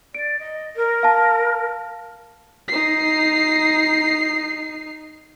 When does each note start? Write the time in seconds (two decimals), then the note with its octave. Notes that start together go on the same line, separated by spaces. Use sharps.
0.15 D5 D7
0.39 D#5
0.76 A#4
1.03 F5 A5
2.68 D#4 C7